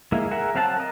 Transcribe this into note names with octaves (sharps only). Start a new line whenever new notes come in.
G#3 A#3 E4
G#4 A#4 E5 F#5
F#3 C4 F5 F#5 A5
A#4 D#5